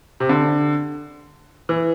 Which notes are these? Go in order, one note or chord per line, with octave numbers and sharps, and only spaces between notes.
C3
D3
E3